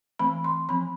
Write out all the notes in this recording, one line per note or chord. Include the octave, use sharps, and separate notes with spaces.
E3 A3 C4 B5
C6
F3 C4 B5